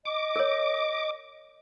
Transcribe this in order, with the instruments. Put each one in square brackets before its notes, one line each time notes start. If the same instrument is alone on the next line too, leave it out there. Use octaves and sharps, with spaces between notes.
[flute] D#5 [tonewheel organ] D6
[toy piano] A#4 C#5